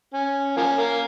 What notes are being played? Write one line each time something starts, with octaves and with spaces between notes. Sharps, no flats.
C#4
F3 A#3 C#4
A#3